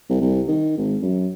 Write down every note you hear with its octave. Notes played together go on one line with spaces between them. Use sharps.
C2
C2
D#3
G#1
F#2